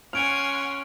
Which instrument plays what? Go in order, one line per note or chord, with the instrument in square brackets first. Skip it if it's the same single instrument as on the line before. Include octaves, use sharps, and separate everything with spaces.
[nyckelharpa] C#4 [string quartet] F#5 G#5 C6 [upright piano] F6 [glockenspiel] D7 F7